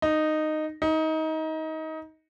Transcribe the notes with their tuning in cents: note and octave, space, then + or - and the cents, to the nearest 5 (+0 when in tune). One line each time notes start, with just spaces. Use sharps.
D#4 -10
D#4 +25